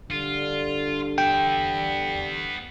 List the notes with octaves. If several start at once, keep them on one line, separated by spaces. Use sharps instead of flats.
D3 G3 F4
B3 E5 G5